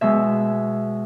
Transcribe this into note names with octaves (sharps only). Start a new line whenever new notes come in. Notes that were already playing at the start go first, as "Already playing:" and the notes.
B2 G#3 E5